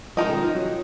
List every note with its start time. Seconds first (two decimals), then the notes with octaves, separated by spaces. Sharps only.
0.17 F3 G#3 D#4 A#4 D#5
0.30 D#3
0.43 F3
0.55 F#3